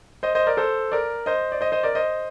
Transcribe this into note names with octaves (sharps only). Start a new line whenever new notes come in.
C5 D#5
C5 D#5
A#4 D5
A4 C5
A#4 D5
C5 D#5
D5
C5 D#5
C5 D#5
A#4 D5
C5 D#5